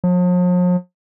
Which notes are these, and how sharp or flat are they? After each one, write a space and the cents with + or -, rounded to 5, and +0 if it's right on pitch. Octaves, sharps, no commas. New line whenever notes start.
F3 +45